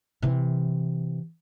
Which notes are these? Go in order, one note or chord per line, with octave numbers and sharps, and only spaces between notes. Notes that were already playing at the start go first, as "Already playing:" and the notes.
C3 E3